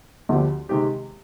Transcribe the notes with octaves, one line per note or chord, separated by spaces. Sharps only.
D2 D3 F3 C4 G4
C3 D#3 G#3 C4 G4